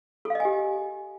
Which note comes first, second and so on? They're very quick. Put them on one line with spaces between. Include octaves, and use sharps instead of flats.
A4 F5 D#5 G#5 G4